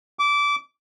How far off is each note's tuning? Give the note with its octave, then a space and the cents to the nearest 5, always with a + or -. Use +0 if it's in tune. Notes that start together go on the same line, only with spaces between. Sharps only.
D6 -20